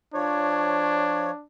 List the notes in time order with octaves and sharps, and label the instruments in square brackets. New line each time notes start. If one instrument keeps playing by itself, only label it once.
[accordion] F3 C#5 [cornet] D4